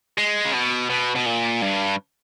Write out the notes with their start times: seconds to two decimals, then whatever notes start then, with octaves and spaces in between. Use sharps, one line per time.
0.18 G#3
0.44 C#3
0.53 B2
0.90 B2
1.15 B2
1.26 A#2
1.62 G2